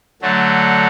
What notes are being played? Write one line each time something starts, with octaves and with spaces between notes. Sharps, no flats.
D3 F#3 A3